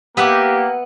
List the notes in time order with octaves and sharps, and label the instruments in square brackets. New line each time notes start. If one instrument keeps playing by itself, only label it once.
[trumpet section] A#3 G4 [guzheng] B3 E5 F#5